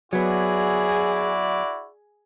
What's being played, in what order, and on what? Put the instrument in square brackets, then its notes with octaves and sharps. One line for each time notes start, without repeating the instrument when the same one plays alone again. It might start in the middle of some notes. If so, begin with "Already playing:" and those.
[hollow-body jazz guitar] F#3 B3 [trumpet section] E4 F#4 D5 [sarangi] G#4